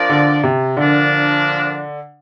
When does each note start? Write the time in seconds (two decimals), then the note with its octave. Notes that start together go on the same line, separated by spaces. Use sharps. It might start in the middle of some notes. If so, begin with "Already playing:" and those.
Already playing: F3 D4 A#4 D5
0.09 D3
0.44 C3
0.77 A#2 D3 F3 D4 A#4